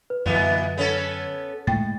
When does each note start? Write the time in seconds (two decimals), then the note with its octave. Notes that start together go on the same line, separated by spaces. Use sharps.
0.10 B4
0.26 F#2 A#2 D3 E3 B3
0.78 B3 C#4 A4
1.67 A2 G#3 G5 A6